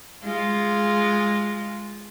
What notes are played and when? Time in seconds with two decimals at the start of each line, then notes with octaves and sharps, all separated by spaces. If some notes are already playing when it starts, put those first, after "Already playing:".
0.24 G#3 F4